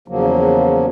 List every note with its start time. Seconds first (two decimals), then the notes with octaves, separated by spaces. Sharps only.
0.08 E2 C#3 F3 F#3 A#3